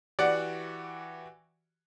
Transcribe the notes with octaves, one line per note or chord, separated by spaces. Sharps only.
E3 F#4 G4 D5 F#5